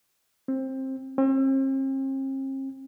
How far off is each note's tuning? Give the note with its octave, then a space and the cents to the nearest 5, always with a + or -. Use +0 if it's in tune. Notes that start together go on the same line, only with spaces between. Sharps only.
C4 +20
C4 +45